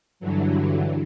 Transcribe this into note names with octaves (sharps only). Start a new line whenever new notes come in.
G2 D3 E3 F#3